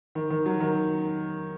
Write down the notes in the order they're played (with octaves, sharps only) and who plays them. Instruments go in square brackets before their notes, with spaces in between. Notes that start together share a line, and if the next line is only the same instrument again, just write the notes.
[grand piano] D#3
D#3
F#3
D#3